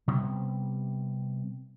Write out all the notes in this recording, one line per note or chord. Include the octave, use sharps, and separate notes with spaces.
C3 G3 B3